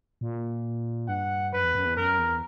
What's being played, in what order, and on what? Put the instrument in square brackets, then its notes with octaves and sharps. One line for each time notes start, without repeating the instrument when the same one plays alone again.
[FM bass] A#2
[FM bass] G2 [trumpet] F#5
[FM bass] F#2 [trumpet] B4
[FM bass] E2
F#2
E2
[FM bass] F#2 [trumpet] A#4
[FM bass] E2